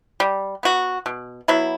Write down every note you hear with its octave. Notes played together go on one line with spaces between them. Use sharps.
G3
B3 F#4
B2
F#3 B3 E4